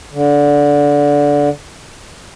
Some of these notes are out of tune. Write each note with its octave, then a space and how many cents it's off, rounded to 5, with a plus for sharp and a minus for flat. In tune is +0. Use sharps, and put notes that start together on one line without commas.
D3 -15